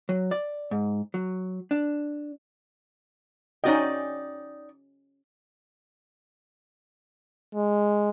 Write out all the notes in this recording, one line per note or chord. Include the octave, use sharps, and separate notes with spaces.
F#3
D5
G#2
F#3
D4
C#4 D#4 F#4 D5 D#5 G5
G#3